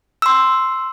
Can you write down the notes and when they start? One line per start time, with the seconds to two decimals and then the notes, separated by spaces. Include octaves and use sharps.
0.22 C6 E6